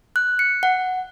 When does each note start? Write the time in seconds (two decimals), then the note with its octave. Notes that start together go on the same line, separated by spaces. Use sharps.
0.16 F#6
0.39 C#7
0.63 F#5